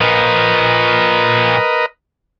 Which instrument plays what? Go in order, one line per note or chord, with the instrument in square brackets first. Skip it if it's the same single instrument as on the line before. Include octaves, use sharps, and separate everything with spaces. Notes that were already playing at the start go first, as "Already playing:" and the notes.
[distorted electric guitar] A#2 F3 [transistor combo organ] A#4 B4 D#5